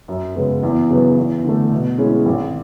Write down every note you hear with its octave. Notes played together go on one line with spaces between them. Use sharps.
F#2
C#3 G#3 B3 F#4
E2
C#3 F#3 B3
E2
D3 A3
B2
G#3 C#4 E4 G#4
G#1